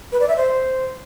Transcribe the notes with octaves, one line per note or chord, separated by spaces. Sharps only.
B4
D5
E5
C5